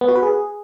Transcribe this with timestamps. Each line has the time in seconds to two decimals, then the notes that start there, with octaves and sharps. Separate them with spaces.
0.01 B3
0.08 F#4
0.16 B4
0.23 G#4